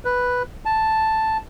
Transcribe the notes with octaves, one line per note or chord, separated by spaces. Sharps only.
B4
A5